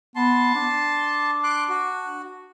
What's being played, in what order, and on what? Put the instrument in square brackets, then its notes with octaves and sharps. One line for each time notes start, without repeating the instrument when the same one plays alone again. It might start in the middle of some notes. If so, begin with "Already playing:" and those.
[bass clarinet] B3 [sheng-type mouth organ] A5 C6
[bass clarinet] D4
[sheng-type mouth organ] C6 D6 F#6
F#4